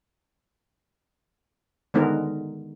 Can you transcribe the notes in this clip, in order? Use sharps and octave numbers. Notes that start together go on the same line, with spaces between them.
D3 D#3 G#3 B3 D#4 A#4